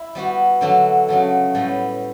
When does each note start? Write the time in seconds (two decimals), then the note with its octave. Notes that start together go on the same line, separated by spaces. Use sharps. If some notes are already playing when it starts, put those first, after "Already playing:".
Already playing: E4
0.15 G3 B3 F#4
0.61 D3 F#3 A3
1.08 C#3 F#3 A3
1.55 A2 G3 B3